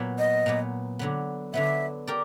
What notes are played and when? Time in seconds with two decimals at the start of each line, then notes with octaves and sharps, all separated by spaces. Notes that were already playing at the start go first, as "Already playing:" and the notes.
Already playing: A#2 F#3 B3
0.19 D#5
0.46 A#2 F#3 B3
0.99 D3 F#3 B3
1.54 D3 F#3 B3 E5
2.07 G4 A#4 D5